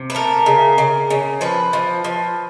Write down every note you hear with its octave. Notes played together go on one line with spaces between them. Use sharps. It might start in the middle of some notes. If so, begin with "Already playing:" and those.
Already playing: C3
B4
A3 A#4
C#3
C#3
C#3
F3 B4
F3
F3